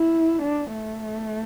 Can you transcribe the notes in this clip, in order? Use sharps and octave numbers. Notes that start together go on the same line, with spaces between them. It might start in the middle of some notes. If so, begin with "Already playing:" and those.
Already playing: E4
D4
A3